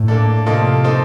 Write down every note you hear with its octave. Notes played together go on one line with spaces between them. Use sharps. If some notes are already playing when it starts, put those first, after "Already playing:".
Already playing: A2
A#3 D4 A4
C3 F3 A#3 F4 A4 D#5
A#3 D#4 A4 C5